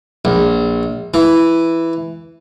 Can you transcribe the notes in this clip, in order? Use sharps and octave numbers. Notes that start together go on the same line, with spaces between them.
A#1
E3